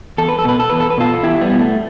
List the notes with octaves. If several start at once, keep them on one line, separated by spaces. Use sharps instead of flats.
E2 A4
B4
A4
B2 B4
A4
E2 B4
A4
B4
B2 F4 A4
E2 E4 G4
G3 B3
B2
A3